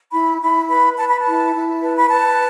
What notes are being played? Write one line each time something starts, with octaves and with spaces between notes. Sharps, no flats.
E4 B5
E4 B5
B4 B5
B4 A5
B5
A5
E4
E4
B4 A5
B5
B4 A5